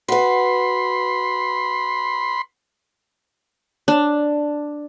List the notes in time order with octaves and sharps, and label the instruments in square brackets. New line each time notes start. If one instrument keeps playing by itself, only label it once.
[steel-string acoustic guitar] F#4 B4 [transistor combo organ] B5 C6
[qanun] D4